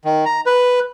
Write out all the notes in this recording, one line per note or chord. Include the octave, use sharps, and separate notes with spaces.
D#3
A#5
B4